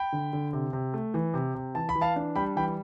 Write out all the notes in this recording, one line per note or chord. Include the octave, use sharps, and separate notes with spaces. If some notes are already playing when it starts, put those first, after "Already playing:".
Already playing: G5 B5
D3
D3
C3
C3
A3
E3
C3
C3
E3 A5
B5
E3
F5 A5
D4
G3 G5 B5
E3 G5 B5